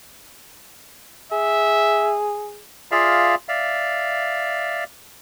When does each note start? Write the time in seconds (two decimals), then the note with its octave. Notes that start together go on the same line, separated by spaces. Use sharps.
1.32 G#4 E5
2.91 F4 G#4 D5 E5 F5
3.49 D5 E5 F5